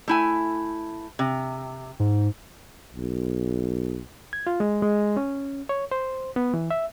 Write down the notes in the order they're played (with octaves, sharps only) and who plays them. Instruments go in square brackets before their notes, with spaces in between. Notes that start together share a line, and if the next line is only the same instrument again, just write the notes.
[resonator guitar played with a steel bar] A3 E4 G#5
C3
[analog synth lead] G#2
[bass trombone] B1
[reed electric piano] G#6
F4
G#3
G#3
C#4
C#5
C5
B3
E3
E5